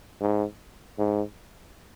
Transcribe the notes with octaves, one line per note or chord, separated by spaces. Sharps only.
G#2
G#2